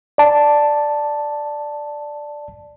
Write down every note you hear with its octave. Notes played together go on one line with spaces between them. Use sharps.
D5 A5